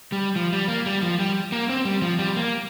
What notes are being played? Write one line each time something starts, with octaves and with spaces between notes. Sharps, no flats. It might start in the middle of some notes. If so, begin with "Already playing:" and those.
G3
F3
G3
A#3
G3
F3
G3
A#3
C4
G3
F3
G3
A#3